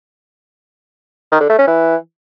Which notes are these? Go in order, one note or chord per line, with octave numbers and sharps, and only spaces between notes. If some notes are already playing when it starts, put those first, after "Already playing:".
D#3
D3
A3
C#4
E3